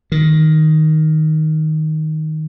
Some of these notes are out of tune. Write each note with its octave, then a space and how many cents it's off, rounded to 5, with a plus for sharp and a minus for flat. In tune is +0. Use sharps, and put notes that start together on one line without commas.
D#3 +5